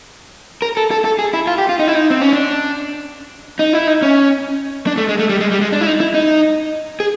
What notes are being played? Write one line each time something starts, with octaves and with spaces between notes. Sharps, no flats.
A#4
A4
A4
A4
G#4
E4
F4
G4
F4
D#4
E4
D#4
C4
C#4
D4
D#4
E4
D#4
C#4
D4
A3
G#3
A3
G3
G#3
G3
G#3
D4
E4
D#4
E4
D#4
G#4